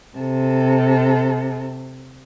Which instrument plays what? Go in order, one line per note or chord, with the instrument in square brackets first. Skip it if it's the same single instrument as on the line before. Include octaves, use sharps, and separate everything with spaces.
[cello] C3 A4